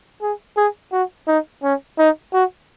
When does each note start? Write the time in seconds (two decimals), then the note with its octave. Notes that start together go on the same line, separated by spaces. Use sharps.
0.22 G#4
0.57 G#4
0.92 F#4
1.27 D#4
1.63 C#4
1.98 D#4
2.33 F#4